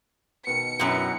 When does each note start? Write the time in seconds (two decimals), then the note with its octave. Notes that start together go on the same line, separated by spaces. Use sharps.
0.47 B2 D#3 C#7
0.79 F#2 B2 B3 E4 G4